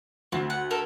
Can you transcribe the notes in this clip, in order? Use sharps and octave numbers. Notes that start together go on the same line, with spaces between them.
D2 C4
F#5
A4 A#4